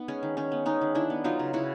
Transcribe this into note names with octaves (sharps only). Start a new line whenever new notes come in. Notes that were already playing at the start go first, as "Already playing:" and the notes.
Already playing: B3 D#4
G#3 C#4
D#3
D#3 C#4
B3
G#3 C#4 D#4
D#3
D#3 D4 E4
B3
F#3 D#4 F4
C#3
C#3 E4 F#4